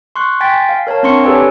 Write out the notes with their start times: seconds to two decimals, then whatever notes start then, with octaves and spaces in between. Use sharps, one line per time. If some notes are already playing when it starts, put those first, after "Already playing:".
0.16 C6 C#6 F#6
0.41 G5 G#5 C6 A6 B6
0.69 F5
0.87 A#4 C#5 F5 A5
1.03 C4 D4 C6 C#6 C#7
1.24 G4 A4 B4 C#5 D5 G#5